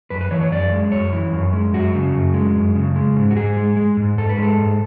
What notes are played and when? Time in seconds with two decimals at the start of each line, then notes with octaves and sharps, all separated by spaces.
0.10 F#2 B4
0.21 B4
0.31 E3 C#5
0.41 C#5
0.52 F#2 D5
0.72 G#3
0.92 F#2 C#5
1.13 E3
1.33 F#2
1.53 G#3
1.73 F#2 F#4
1.95 C#3
2.14 F#2
2.34 G#3
2.55 F#2
2.75 C#3
2.96 G#3
3.16 G#2
3.31 F#4
3.36 G#2 G#4
3.57 G#3
3.77 G#3
3.97 G#2
4.18 G#2 A4
4.29 B4
4.38 G#3 A4
4.58 G#2